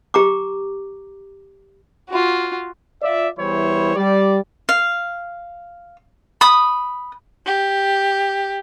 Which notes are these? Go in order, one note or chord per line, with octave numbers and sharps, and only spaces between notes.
G4 A#5 D6
F4 F#4
F4 D5 E5
E2 E3 G3 E4 C5 C#5
G3 D5
F5
B5 D#6
G4